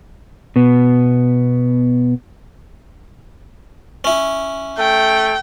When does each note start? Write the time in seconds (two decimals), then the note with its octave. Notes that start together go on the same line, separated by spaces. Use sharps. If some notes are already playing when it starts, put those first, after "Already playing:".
0.56 B2 B3
4.04 C#4 E4
4.79 A3 G5